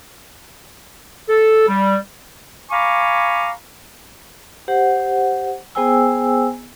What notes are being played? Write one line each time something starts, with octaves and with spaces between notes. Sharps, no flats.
A4
G3
F5 G#5 A#5 B5 C#6 D6
G4 C5 F#5
B3 G#4 C5 G5 G#5 E6